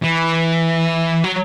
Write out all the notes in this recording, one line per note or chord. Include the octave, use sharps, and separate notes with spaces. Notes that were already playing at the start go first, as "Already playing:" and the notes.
E3
F#3